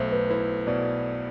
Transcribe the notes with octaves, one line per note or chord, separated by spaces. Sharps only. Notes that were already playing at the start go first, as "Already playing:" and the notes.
Already playing: B1 A3 C5 E5
B4
E4 C5
B2 D5